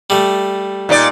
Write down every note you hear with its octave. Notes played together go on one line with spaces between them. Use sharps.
G3 A3
A#2 D#4 D5